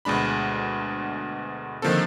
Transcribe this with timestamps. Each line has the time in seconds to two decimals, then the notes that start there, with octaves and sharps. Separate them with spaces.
0.05 D2 B2 G#3 D4 B5
1.82 D3 D#3 F3 A#3 C4 A4